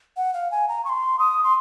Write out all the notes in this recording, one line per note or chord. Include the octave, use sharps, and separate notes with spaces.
F#5
F5
G#5
A#5
C#6
C6
D#6
C6